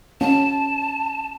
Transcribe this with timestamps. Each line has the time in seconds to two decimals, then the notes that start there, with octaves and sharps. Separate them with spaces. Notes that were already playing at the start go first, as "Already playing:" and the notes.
0.21 C#4 A5